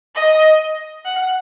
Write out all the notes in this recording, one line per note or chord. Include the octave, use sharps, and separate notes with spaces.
D#5
F#5